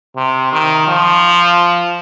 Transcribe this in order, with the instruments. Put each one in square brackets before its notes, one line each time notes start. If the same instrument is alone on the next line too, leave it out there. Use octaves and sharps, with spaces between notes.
[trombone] C3
D#3
F3